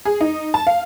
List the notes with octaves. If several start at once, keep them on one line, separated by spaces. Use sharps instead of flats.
G#4
D#4
A5
F5